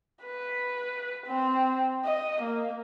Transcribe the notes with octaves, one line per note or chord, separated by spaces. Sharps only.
B4
C4
D#5
A#3